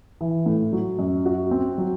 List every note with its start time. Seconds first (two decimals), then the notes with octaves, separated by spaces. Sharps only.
0.21 E3
0.46 A2
0.72 F#3
0.99 F#2
1.26 F#4
1.51 C4
1.78 F#3